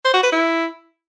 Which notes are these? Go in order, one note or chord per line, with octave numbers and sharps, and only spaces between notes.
C5
F#4
B4
E4